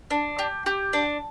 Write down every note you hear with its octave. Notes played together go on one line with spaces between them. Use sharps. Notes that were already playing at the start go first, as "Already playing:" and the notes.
D4
G4
G4
D4